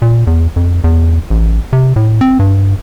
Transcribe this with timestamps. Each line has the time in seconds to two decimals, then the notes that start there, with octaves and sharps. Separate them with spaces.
0.02 A#2
0.27 E2
0.56 F2
0.84 E2
1.30 A1
1.73 C3
1.96 A2
2.21 C4
2.39 G2